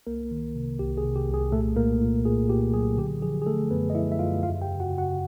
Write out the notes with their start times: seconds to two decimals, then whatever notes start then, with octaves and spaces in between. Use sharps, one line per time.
0.07 C2 A#3 A#4
0.31 D#3
0.56 C3
0.79 C2 G4
0.98 G#4
1.04 C3
1.16 G4
1.28 C2
1.34 G#4
1.52 A#2 A3 A4
1.76 A#2 A#3 A#4
2.01 A#2
2.25 A#2 G#4
2.49 A#2 G4
2.74 F#3 G#4
2.97 D3 G4
3.22 F3 G#4
3.42 G#4
3.46 D3 A3 A4
3.70 F#2 B3 B4
3.90 D#5
3.95 F3 E4 E5
4.12 E5
4.19 F#2 F4 F5
4.43 E2 F4 F5
4.62 G4 G5
4.68 C#3
4.80 F#4 F#5
4.92 C#3
4.98 F#4 F#5